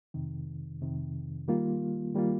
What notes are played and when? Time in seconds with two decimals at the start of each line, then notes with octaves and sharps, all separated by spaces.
0.14 F2 C3 D#3
0.81 F2 C3 D#3
1.48 D#3 G3 A#3 F4
2.14 D#3 G3 A#3 F4